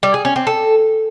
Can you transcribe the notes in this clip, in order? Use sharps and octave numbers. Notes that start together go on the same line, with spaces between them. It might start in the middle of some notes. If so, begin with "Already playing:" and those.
G3
G#4
C#4
C4
A4